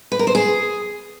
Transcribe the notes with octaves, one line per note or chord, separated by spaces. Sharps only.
B4
A#4
C5
G#4